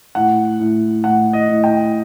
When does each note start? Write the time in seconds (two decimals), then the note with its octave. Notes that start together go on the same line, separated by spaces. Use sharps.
0.15 A2 F#5
0.60 A2
1.04 A2 F#5
1.33 D#5
1.48 A2
1.64 G5